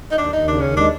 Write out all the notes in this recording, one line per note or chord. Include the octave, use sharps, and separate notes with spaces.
D#4
D#2 D4
D#2 D#4
C#3 D4
D#2 C#4
G#3 D4